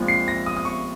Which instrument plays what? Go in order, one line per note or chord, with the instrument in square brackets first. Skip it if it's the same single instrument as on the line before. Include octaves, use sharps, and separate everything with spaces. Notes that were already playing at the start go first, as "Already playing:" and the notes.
Already playing: [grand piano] A#1 A#2 F3 G#3 C4
C7
A#6
D#6
D#6
C#6